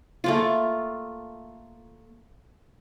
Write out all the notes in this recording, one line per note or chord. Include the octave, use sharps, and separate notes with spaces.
A3 A#3 F4